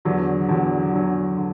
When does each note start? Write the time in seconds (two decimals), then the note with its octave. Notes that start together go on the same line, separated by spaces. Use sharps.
0.05 E2 D3 F#3
0.49 E2 D3 F#3
0.92 E2 D3 F#3
1.37 D3